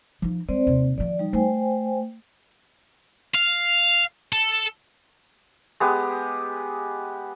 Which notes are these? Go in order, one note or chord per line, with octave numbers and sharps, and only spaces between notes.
F3 D#4
G#3 C4 C5 D5
D#2 C3
D#3 F3 D5
G3 D#4
A3 C5 G5 G#5
F5
A4
G#3 B3 G4